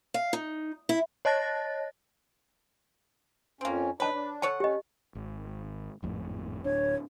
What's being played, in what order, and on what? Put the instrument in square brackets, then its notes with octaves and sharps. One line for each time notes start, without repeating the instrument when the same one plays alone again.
[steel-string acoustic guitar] F5
D#4
E4
[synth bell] C#5 D#5 A5 F#6 A6 A#6
[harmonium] F2 C#4 [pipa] A#3 C4
[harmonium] D4 D#4 [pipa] B4 [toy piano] C#5 A5
[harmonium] D4
[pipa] A4 C#5 F#5 [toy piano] A5
[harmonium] C#4 [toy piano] G4 D#5
[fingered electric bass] G#1
G#1 F2 A2
[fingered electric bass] D1 D4 [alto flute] C#5